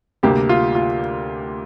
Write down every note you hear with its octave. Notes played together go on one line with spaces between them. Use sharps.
D2 C3 G3 A#3 G4
F4
F4